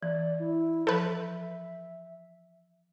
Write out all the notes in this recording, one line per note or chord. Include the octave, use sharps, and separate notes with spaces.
E3 D5
E4
F3 A4 B4 E5 G6